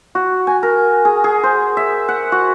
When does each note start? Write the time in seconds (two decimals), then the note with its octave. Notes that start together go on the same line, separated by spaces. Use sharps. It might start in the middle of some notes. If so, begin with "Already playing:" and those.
0.15 F#4
0.47 G#5
0.63 A#4
1.05 G#4
1.24 G#4
1.43 C5
1.77 E5
2.08 F#5
2.32 F#4